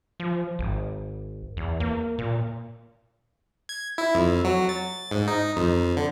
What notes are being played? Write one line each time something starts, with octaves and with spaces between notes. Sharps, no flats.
F3
G#1
E2
A#3
A#2
G#6
E4
F2
F#3
A6
G#2
D#4
F2
D3